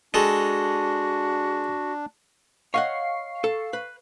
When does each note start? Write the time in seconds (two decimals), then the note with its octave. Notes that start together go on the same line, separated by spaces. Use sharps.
0.14 G#3 D4 F#4 A4
2.74 C#5 D#5 F5 F#5 C#6 C7
3.44 A4
3.73 B4